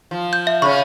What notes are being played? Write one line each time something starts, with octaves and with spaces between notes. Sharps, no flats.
F3
G6
E5
C#3 C#4 C#6